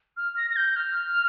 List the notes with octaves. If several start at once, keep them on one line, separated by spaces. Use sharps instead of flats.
F6
A#6
A#6
G6
F6